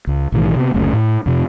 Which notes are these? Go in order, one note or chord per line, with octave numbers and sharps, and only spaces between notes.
C#2
B1 A2 D#3 E3
C3 B3
F#1 D2 A3 C#4
A2
F2 C3